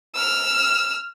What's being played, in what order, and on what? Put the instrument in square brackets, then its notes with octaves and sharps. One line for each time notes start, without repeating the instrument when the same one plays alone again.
[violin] E6 F6